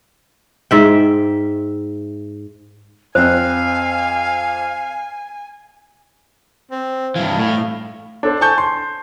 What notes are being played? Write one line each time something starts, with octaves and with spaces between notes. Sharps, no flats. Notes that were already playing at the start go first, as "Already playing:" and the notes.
G#2 E5 G5
F2 C4 C5 F5 G#5
C4
G2 E3 F5
A2
D4 A4 C5
G#5 A5 C#6 G6
C6